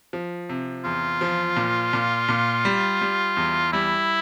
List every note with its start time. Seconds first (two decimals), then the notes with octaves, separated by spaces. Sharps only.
0.13 F3
0.49 C3
0.84 E2 F4
1.21 F3
1.57 A#2
1.93 A#2
2.29 A#2
2.65 G3
3.01 G3
3.37 E2
3.73 G3 E4